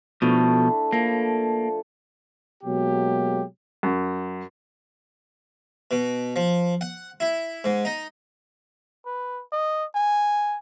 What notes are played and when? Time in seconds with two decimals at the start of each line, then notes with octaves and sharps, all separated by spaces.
0.22 B2 F3 A3 D4 E4
0.93 F3 A#3 A4
2.64 B2 F#3 G#3 A#3 G4
3.83 F#2
5.91 B2
6.36 F3
6.81 F#5
7.20 E4
7.64 G#2
7.85 D#4
9.06 B4
9.52 D#5
9.95 G#5